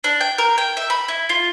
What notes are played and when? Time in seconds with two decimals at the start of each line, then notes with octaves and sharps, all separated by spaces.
0.04 D4
0.21 G5
0.38 A#4
0.58 G5
0.77 E5
0.90 B5
1.08 E4
1.29 F4